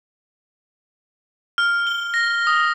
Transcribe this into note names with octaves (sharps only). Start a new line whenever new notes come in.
F6
G7
A#6
D#6